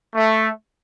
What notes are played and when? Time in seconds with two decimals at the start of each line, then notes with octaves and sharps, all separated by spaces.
0.15 A3